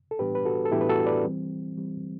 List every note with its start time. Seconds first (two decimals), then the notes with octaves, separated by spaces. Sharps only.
0.11 A4
0.19 A2 E3 G3 B3 D4 G4 B4
0.35 B4
0.46 F#4 A4
0.65 A4
0.72 A2 E3 G3 B3 D4 E4 G4
0.81 B4
0.89 F#4 A4
1.06 B4 D5
1.25 E3 G3 C4
1.77 E3 G3 C4